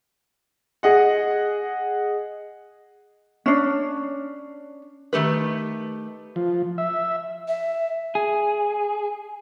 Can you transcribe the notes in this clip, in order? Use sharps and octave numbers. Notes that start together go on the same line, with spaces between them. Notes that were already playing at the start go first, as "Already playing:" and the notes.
G#4 D#5 F#5
C#4 D4
D#3 A3 G4 B4
F3
E5
E5
G#4